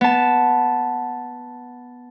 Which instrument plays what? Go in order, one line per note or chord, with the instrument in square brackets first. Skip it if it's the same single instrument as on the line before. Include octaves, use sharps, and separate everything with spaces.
[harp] B3 A5